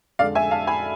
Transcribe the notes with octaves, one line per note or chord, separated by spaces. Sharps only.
F2 D3 G#3 D5 F5
E5 G#5
F5 A5
G#5 B5